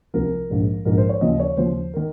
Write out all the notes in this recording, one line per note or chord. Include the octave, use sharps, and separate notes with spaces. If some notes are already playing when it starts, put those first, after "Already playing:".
C2 C3 F3 A#4
A#1 G#2 F3
A#1 G#2 F3 A#4
C5
C#5
D#2 C#3 F3 D#5
C#5
D#2 C#3 F3 C5
D#3 A#4